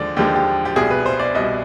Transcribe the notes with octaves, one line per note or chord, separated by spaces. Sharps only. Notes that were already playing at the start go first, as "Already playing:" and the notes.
Already playing: D#2 D3 F3 G#3 D5
D#2 D3 F3 G#3 G4
G4
G4
C2 B2 G3 G#4
B4
C5
D5
C2 B2 G3 D#5